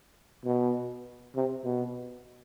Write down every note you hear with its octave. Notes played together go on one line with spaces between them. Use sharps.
B2
C3
B2